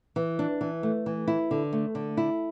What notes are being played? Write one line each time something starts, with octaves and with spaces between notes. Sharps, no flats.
E3
D4
E3
A3
E3
E4
D3
A3
D3
E4